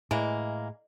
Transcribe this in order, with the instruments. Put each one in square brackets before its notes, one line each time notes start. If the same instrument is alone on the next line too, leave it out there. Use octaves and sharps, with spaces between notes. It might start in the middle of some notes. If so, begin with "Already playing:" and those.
[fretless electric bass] A2 [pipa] E3 A#3 [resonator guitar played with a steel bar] G#3